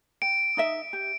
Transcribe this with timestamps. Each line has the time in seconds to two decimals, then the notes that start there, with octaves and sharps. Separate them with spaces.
0.22 G5 D7
0.57 D#4 D#5 E5
0.93 G4